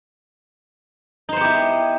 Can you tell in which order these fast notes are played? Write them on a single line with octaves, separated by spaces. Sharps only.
D#4 C5 B3 G4 E4